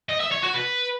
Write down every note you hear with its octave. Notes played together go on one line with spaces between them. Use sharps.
D#5
E5
C#5
F#4
B4